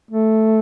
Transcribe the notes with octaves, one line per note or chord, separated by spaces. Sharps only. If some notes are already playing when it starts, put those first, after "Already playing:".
A3